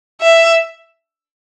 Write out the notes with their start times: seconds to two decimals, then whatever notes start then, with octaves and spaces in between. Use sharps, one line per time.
0.21 E5